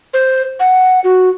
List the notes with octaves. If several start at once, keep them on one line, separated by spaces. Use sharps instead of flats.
C5
F#5
F#4